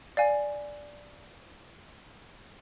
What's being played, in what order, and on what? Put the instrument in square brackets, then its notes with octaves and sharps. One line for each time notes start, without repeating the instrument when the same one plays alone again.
[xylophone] D5 F5 G#5